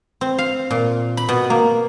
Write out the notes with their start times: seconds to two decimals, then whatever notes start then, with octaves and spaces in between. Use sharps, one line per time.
0.21 C4
0.38 F5
0.71 A#2
1.17 B5
1.29 B2
1.50 A#3